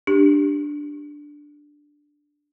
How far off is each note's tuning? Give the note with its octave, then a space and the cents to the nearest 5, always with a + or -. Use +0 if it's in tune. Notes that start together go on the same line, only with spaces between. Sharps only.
D4 +0 G4 +0